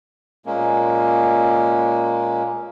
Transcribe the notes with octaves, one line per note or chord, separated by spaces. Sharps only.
A#2 G#3 A#3 C#4